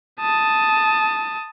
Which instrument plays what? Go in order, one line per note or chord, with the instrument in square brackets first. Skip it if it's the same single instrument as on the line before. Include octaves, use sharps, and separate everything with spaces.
[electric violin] A5 D#6